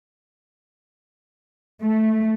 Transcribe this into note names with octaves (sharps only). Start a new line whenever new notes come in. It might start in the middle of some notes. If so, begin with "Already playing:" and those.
A3